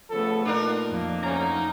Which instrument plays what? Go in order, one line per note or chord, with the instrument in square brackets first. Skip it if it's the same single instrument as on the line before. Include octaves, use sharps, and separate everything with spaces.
[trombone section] C#3 F3 A4 [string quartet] A3 B3
[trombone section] A#2 [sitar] D4 D#4 A#4
[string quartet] F2 A#3
[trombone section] D2 C#4 [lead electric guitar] D#4 A#5